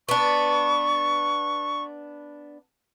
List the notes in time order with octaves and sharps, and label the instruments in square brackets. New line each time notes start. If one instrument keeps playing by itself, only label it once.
[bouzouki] B3 D4 [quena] C#6